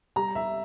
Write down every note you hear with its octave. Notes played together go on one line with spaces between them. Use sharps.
G3 A#5
E5